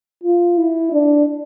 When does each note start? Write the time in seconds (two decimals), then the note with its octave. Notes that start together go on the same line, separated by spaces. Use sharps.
0.24 F4
0.58 E4
0.92 D4